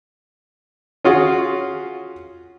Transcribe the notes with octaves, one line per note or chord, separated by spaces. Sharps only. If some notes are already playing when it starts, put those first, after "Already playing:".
C#4 F4 F#4 G#4